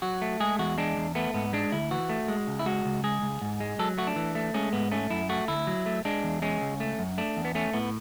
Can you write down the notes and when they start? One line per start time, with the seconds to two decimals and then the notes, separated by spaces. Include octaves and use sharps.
0.02 F#3 F#4
0.22 A3
0.40 G#3 G#4
0.59 E2 F#4
0.78 G#3 D4
0.97 E2
1.15 A3 B3
1.34 G#2 B3
1.53 G#3 D4
1.72 D2 E4
1.91 E3 F#4
2.09 A3
2.28 G#3
2.47 C#2
2.59 E4
2.66 G#3 F#4
2.85 C#2
3.04 G#3 G#4
3.22 C#2
3.42 G#2
3.60 G#3
3.79 F#3 A4
3.98 A3 F#4
4.07 D4
4.16 E3
4.35 A3
4.54 G#3 C#4
4.73 G#2 B3
4.92 A3 C#4
5.10 F#2 E4
5.29 A3 F#4
5.48 D2 E4
5.67 F#3
5.86 A3
6.05 G#3 D4
6.24 E2
6.42 G#3 C#4
6.62 C#2
6.80 A3
6.99 F#2
7.18 A3 D4
7.37 E2
7.45 B3
7.55 A3 C#4
7.74 A2 B3